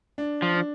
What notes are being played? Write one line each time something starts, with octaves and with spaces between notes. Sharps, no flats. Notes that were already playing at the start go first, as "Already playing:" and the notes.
D4
F3
D4